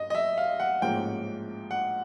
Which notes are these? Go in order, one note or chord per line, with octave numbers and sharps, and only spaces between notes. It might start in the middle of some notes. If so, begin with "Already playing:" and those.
Already playing: G2 D#5
D#5
E5
F5
F#5
A1 G#2 F3 A#3 C#4 G5
F#5